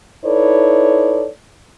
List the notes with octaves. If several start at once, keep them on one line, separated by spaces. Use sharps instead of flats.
D#4 E4 A4 B4 C#5 D5